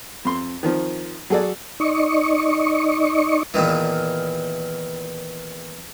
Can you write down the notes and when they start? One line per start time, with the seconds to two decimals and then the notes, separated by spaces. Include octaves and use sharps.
0.25 F2 C6
0.63 D#3 F3 C4
1.30 F#3 F#4 G#4 A4 D5
1.80 D#4 D5 D#5 C#6
3.54 E2 A#2 D#3 E3